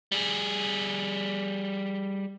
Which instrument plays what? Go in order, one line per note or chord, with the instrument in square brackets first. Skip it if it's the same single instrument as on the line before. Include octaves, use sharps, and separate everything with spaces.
[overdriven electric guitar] G3 G#4